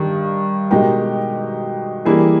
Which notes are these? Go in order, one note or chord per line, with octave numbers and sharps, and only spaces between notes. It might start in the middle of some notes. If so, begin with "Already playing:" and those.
Already playing: G2 D#3
B2 G#3 D#4 G4 A#4
E3 G3 A#3 E4 G#4